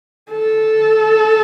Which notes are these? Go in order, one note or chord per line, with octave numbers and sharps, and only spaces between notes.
A4